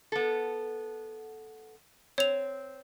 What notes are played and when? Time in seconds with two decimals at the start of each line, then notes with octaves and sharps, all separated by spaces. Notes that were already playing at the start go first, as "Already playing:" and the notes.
0.12 B3 A4
2.18 C4 C#5 F7